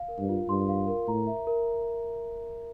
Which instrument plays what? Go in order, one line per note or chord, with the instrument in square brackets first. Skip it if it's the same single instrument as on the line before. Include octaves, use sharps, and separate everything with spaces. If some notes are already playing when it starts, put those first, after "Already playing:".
Already playing: [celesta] F5
A#4
[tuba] G2
[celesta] F4
[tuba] G2 [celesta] C6
[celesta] F5
A#4
[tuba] A2 [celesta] A#5
[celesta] E5
A#4